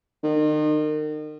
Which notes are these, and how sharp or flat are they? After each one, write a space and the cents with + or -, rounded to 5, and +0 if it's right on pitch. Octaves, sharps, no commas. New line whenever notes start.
D#3 -35